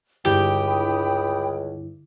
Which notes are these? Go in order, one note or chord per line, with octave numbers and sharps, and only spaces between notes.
C#2 G2 D3 E4 G4 G5 B5 D#6